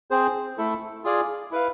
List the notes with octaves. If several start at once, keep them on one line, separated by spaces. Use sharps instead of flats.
C4 G#4 C5
A3 E4 A4
F4 G#4 D5 F5 G#5
E4 B4 F5